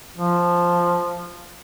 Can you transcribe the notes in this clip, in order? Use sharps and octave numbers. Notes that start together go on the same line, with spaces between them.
F3